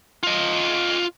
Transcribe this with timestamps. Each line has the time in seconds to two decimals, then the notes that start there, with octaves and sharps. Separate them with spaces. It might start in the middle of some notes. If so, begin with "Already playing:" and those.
0.23 F4 D#5